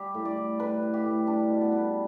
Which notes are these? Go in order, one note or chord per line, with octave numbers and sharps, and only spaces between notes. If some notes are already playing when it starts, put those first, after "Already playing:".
Already playing: G3 G4
A2
D5
G3
A2 B4
G3
G4
A2
G3 D4
B2
B3
G3